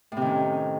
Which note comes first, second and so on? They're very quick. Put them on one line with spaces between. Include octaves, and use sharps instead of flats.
A2 C3 D#3 C#4